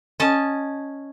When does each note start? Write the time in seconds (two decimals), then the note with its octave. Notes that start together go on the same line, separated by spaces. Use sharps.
0.20 C#4 D#5 A5